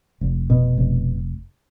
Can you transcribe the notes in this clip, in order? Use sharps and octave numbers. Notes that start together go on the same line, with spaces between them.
F1
B2
F1